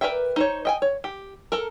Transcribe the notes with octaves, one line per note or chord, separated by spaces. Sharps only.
A#4 B4 D5 E5 G5
D#4 C5 C#5
D#5 G5 G#5
C#5
G4
A4 A#4